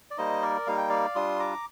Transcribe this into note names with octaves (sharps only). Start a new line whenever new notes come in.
D5
G3 A#3 D#4 C5 D#5
A#4 D5
G3 A#3 D#4 F5
G5
D5 F5
G3 D4 F4 C6 D#6
A#5 D6